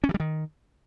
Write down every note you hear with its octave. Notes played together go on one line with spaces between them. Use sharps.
C#4
E3
G3
D#3